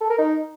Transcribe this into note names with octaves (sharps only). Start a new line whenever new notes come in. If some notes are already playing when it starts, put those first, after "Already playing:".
A4
A#4
D#4